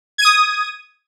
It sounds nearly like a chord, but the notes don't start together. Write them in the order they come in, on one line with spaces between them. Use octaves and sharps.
G#6 D#7 D#6